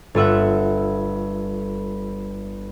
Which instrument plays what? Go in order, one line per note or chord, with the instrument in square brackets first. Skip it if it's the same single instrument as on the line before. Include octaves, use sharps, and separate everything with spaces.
[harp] G1 F4 E5 F#5